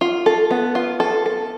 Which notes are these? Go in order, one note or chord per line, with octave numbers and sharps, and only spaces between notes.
F4
A4
B3
F4
A4
A4